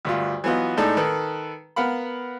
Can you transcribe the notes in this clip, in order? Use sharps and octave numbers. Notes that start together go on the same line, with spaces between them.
D2 G2 F4
E3 F#3 B3 F4 D#5
A2 G#3 D4 D#4 A4 A5
D#3 A4 B4
B3 A#4 F5 F#5 B5